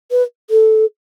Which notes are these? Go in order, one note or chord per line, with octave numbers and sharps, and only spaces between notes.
B4
A4